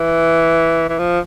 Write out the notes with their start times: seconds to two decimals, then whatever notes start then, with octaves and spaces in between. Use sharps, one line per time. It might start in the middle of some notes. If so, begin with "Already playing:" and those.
Already playing: E3
0.89 E3
0.98 F3